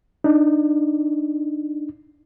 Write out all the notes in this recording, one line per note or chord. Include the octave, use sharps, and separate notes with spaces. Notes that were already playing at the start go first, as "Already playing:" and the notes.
D4 D#4